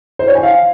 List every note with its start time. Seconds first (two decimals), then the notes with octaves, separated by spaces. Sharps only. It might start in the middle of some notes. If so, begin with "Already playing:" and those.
0.19 C5
0.27 C#5
0.35 G#5
0.43 F5